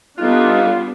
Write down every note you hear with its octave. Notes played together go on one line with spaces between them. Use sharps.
G3 B3 D4 D#4 F4 A4 F#6